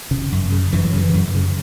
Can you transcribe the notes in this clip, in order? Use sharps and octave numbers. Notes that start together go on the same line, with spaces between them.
C#3
F#2
C#3
F#2 E3
F#3
C#3 E3
F#2
C#3